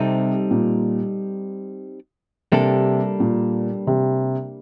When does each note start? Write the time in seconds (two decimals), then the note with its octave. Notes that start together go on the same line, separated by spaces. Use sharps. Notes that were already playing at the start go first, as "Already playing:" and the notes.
Already playing: C3 G3 C4 D#4 A4
0.51 A#2
2.52 C3 G3 A#3 D4 A4
3.20 A#2
3.87 C3